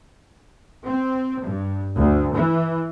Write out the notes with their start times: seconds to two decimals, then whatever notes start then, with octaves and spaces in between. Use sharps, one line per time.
0.86 C4
1.46 G2
1.96 D2
2.33 E3